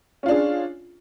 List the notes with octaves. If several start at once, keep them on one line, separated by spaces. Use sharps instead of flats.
C#4 D4 F4 G#4